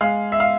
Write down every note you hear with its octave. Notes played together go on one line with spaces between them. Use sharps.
G#3 F5
E5
F5